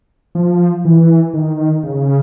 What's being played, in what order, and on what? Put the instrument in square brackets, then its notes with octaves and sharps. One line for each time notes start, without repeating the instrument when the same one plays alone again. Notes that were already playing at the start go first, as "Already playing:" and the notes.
[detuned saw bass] F3
E3
D#3
C#3